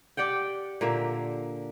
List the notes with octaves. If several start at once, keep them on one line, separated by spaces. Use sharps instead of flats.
G4 D5 F#5 G5
A#2 D3 A#3 E5